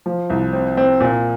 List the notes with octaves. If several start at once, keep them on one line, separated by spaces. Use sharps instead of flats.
F3
C2
C4
C4
A#2